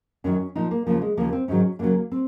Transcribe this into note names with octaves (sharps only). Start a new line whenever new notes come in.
F#2 D#3 F#3 C#4
A#2 F3 D#4
A#3
D#2 C#3 F3 A#3
G#3
D#2 C#3 F3 A#3
C4
G#2 D#3 F#3 C#4
F#2 C#3 F#3 A#3
C4